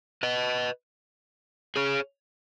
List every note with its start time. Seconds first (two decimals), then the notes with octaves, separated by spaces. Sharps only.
0.23 B4 D#5
1.76 G#4 C#5